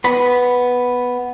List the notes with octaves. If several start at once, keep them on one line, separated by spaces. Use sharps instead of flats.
B3 B5